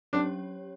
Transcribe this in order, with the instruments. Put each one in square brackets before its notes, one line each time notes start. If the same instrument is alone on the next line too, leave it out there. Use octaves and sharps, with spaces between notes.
[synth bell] F#3 C#4 G4 C#5 [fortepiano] D4